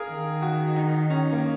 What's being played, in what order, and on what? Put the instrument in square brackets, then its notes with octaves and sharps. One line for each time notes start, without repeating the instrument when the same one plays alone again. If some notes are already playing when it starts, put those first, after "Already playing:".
Already playing: [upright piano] G#4 A#4 F5
[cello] D#3
[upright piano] F#4
D#4
C#4
A#3